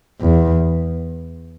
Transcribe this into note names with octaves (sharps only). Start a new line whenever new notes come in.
E2